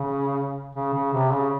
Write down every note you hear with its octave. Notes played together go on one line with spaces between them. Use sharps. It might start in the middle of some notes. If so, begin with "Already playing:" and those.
Already playing: C#3
C#3
C#3
C3
C#3